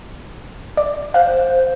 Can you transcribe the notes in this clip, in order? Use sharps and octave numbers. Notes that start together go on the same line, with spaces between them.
D5
C5 F5 F#5